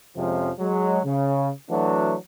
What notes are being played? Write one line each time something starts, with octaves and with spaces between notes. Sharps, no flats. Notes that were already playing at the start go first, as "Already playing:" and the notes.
F2 C3 F3 G#3 C#4
F#3 G#3
C#3
E3 F#3 A3 D4 F#4